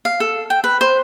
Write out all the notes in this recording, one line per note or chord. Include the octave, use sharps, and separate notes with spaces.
F5
A4
G5
B4
C5